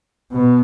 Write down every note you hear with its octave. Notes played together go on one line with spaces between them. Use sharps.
B2